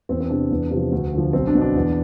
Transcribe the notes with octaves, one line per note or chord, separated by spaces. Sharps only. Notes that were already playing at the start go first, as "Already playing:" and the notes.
E2 C4
C4
C3 E3 D4
E2
C3 F3
D2
D3 F3
B1 C4
D4
B2
D4
E2